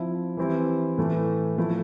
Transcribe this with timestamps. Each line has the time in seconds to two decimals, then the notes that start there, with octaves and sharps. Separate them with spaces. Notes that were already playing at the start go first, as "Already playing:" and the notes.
Already playing: F3 C4 E4
0.37 E3 G3 C4 E4
0.98 A2 E3 A3
1.57 F3 A3 E4